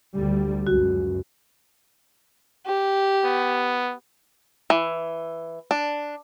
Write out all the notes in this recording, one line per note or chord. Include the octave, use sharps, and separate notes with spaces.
D2 D3 G3
C#2 F#2 F#4
G4
B3
E3
D4